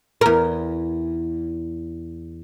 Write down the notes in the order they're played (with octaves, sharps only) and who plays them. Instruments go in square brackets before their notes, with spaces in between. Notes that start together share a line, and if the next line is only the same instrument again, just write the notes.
[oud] E2 A#4